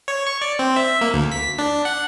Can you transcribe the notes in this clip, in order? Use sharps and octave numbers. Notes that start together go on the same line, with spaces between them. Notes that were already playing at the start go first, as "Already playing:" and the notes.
C#5
C#6
D5
C4
E5
A#3
D2
B6
D4
F#5